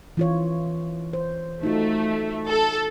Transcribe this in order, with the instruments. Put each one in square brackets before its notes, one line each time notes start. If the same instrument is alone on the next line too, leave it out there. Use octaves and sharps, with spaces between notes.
[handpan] E3 F4 C#5
C5
[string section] A3 [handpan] D#4 F4 F#4
[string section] A4